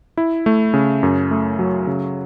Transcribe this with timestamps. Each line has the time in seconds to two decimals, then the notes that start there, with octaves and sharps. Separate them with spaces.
0.17 E4
0.46 A3
0.74 C#3
1.03 F#2
1.31 A3
1.59 F#3
1.87 C#3